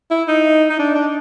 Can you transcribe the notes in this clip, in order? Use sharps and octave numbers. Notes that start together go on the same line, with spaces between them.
E4
D#4
D#4
D4
D4